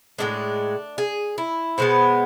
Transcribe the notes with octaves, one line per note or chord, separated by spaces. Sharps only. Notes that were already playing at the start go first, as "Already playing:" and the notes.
A2 F3 G#3 D4
G#4
E4
B2 G#3 B3 C5